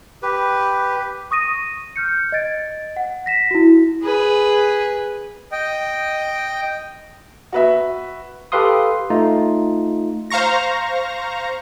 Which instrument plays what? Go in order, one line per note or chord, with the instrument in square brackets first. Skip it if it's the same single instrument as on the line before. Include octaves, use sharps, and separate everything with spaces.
[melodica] G4 B4
[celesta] C#6 D#6 A#6 D#7
F6 G6 C#7
D#5 G#6 A6 D7
F#5
A#6 B6 E7
E4 F#4
[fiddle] G#4 B4
[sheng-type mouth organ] D#5 G5
[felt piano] F#4 B4 E5
[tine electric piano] G4 A4 B4 F5 C6 D#6
A3 D#4 F4
[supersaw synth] C5 F5 A#5 C#6 A#6